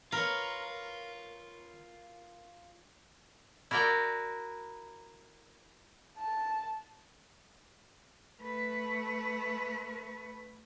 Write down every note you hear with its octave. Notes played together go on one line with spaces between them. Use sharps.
F4 A#4 B4 C#5
E4 F#4 A#4 D5 G5 A#5
A5
A3 B4